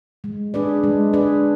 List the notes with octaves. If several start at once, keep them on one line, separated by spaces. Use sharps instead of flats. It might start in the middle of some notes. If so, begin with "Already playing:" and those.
G#3
D4 G#4 B4 D5
G#3
D4 G#4 B4 D5